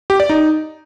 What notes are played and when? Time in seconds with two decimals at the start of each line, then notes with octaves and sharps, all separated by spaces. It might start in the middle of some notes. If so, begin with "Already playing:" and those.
0.10 G4
0.20 D5
0.29 D#4